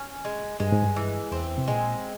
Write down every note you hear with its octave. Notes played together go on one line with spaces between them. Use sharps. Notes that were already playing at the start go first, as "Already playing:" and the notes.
Already playing: C#4
G#3
G2 G#3
G#2
G2
E3
E2 C4
C3
A#2 G#3